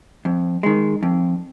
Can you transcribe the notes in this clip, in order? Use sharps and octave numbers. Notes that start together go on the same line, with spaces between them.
F2
D#3 G#3
F2